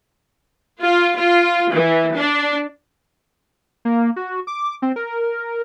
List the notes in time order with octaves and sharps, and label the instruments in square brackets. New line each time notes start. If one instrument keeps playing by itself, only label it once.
[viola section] F4
F4
E3
D4
[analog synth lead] A#3
F#4
D6
C4
A#4